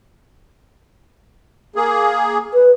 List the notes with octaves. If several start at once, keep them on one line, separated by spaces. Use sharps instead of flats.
A#3 G#4
B4